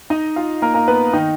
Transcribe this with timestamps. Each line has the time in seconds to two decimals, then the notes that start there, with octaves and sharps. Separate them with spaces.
0.10 D#4 D#5
0.36 F4 F5
0.62 A#3 A#4
0.74 A#3 A#4
0.88 B3 B4
1.13 D#3 D#4